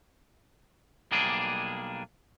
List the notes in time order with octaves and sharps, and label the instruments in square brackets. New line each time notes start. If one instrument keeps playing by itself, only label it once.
[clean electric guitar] B1 G3 A#3 D4 G#4